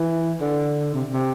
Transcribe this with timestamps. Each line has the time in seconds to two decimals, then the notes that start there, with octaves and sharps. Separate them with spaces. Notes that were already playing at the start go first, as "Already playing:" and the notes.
Already playing: E3
0.41 D3
0.94 C3
1.12 C3